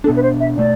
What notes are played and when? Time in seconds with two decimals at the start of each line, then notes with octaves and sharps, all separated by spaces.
0.04 D4 A4
0.07 B2 B3
0.16 B4
0.23 C5
0.40 E5
0.57 B2 A3 D5